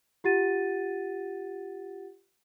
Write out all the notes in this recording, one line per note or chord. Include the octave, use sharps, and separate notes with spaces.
F4 G4 F#5 A6 D#7